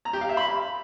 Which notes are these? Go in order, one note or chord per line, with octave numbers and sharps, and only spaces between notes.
A#5
G4
F5
E5
B5